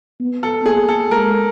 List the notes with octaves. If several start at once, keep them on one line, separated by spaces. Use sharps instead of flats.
B3
A4
A#3 G#4
A4
G#3 A#4